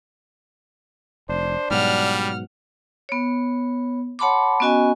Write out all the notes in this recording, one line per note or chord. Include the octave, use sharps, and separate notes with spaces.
F1 D4 C5
G#2 B2 F#3 G3 F#5 F6
B3 C#5
C#5 F#5 A5 B5 C6 D6
B3 C#4 F#4 D#5 G#5